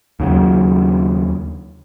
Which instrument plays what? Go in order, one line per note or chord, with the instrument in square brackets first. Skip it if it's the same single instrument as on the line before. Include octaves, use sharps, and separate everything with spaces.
[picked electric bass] D#2 C#3 F#3